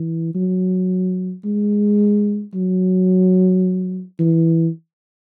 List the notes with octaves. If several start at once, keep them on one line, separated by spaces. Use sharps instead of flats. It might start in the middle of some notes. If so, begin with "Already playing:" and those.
Already playing: E3
F#3
G#3
F#3
E3